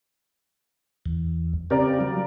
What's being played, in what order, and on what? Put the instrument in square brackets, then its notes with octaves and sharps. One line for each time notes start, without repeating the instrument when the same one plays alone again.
[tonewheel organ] E2
[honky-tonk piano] C#3 A#4 D5 [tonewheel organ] C4 G4
[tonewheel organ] F#3